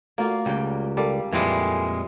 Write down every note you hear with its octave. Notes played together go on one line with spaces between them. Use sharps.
A3 A#3 F4 F#4 D5
C#2 G3 G5
G3 A4 A#4 D5 F5
F2 A#2 E3 G3 G#3 E4